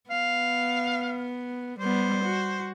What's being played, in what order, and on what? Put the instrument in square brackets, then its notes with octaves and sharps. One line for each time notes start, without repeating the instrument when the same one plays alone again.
[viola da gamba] B3 [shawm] F5
[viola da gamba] G3 B3 [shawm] C5
[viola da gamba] F#4